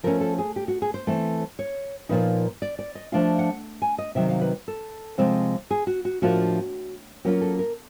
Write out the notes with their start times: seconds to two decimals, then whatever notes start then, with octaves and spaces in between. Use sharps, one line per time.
0.03 F3 A3 C#4 A#4
0.21 A4
0.39 G#4
0.56 G4
0.68 F#4
0.82 G#4
0.94 C5
1.07 E3 A3 C4
1.59 C#5
2.09 A#2 F3 A#3 D#4 B4
2.62 D5
2.79 D5
2.95 D#5
3.12 F3 A3 D4 F4 F5
3.39 F#5
3.82 G#5
3.98 D#5
4.15 C3 D#3 F#3 E5
4.29 F5
4.41 B4
4.68 A4
5.18 C3 F3 G#3 C4
5.71 G#4
5.87 F#4
6.05 F#4
6.22 A2 F3 A#3 D4 F4 F#4
7.25 F#3 A#3 C#4 F4 G4
7.41 A4
7.59 A#4